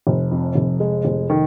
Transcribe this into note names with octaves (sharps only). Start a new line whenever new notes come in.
F1
F2
F1
G#3
F1
D#3